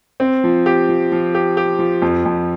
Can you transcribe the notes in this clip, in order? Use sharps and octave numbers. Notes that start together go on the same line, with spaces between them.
C4
F3
G4
F3
F3
G4
G4
F3
F2
F2